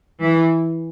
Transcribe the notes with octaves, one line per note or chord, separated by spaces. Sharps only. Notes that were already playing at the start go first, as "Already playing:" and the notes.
E3